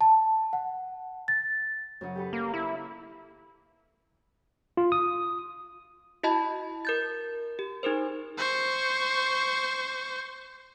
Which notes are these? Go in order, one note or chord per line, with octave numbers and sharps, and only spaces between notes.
A5
F#5
A6
F#2 C#3 F#3
G4 A4 B4
A#3
E4
F4
D#6
E4 F#4 D#5 A5 B5
A#4 G6 A6
G4
D#4 G#4 A#4 C5
C5 C#6